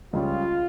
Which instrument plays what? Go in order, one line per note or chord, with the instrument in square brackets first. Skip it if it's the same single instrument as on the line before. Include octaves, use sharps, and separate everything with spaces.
[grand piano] C#2 C#3 G3 C#4 [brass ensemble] F4